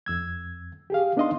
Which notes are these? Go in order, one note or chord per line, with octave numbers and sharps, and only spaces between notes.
F2 E6 G#6
G4 G#4 F5
B3 D4 D#4 D#5 F5 C6